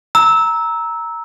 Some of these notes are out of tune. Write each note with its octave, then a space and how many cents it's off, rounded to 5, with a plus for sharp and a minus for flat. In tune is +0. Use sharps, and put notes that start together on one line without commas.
A#5 +0 E6 -15